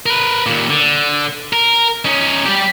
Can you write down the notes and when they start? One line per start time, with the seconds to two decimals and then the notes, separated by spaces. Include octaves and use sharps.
0.06 A#4 B4
0.46 D#2 A#2
0.70 D3
1.53 A#4
2.05 C#4 D#4
2.46 G3 G4